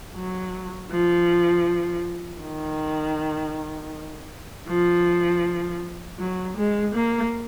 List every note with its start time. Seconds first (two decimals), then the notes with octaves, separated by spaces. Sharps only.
0.14 F#3
0.91 F3
2.41 D#3
4.68 F3
6.19 F#3
6.56 G#3
6.95 A#3